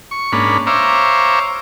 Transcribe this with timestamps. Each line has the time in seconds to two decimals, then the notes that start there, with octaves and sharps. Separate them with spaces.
0.11 C#6
0.32 G#2 A#3 C#4 D4 B5
0.67 C5 C#5 E5 F5 A#5 D6